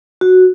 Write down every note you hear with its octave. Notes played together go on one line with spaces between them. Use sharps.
F#4